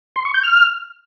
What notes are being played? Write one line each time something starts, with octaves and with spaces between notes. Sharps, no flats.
C6
C#6
G6
F6